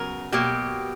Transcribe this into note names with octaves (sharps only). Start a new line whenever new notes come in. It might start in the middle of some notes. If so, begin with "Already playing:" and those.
Already playing: C#3 F#3 B3 A#4
B2 F#3 A#3 G4